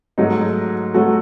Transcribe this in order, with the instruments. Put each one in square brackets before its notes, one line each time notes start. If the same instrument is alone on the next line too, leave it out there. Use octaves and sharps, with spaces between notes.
[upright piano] G#2 F#3 A3 D#4
F#3 A3 F#4